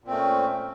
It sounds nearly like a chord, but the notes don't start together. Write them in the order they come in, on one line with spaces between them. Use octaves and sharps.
A#2 C4 A3 C#4